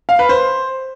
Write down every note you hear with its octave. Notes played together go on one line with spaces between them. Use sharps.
F5
B4
C5